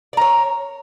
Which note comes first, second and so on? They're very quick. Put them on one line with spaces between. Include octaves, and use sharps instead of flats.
D5 A#4 C#5